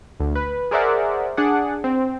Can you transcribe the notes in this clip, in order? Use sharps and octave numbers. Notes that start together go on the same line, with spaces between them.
D2
B4
G#4 A#4 C5 D5 E5 F#5
D4 G#4 D5 F#5
C4